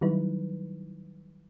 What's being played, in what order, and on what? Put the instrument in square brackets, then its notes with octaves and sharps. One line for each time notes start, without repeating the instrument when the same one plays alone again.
[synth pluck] D#3 F#3 G3 D#4 E4 B4